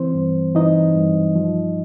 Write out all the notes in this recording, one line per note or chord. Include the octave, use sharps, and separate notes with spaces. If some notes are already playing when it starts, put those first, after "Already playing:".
Already playing: E3 C4 C5
G2
E3 D#4 D#5
G2
F3